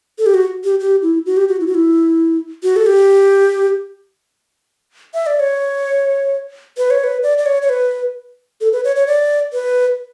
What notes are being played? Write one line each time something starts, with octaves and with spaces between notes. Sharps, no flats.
A4
G4
F#4
G4
G4
E4
F#4
G4
F#4
E4
F#4
E4
F#4
A4
G4
E5
D5
C#5
B4
C#5
B4
D5
D5
C#5
C#5
B4
A4
B4
C#5
C#5
D5
B4